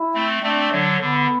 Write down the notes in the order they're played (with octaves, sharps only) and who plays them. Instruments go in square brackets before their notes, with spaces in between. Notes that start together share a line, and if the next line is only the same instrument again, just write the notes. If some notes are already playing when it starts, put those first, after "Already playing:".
Already playing: [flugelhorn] E4
[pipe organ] A3 C4
[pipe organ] A3 C4 [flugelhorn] D4
[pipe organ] D3 F#3
[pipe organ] D3 [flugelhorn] B3